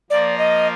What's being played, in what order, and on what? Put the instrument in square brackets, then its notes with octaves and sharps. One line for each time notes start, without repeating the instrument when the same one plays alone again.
[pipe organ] F3 A#3 F4 A#4 [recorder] D5
[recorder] D#5